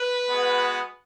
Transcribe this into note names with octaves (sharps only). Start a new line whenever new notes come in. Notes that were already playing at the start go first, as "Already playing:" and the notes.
Already playing: B4
G#3 B3 F#4